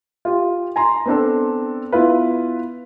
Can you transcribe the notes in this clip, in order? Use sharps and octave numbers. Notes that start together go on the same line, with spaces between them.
F4 G4
G#5 A#5 C6
B3 C4 D4 A4
B3 E4 F4 B4